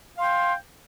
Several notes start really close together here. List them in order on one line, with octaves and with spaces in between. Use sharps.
F5 C6 G5